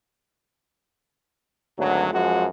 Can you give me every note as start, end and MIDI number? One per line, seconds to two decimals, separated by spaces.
1.78 2.08 32
1.78 2.08 38
1.78 2.08 54
2.12 2.46 42
2.12 2.46 53
2.12 2.46 56
2.12 2.46 66